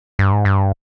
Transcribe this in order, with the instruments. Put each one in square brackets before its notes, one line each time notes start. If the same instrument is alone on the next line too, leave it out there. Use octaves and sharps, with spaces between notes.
[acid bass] G2
G#2
G2